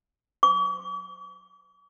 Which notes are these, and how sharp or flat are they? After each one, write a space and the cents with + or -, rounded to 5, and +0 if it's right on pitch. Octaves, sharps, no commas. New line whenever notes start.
D6 -45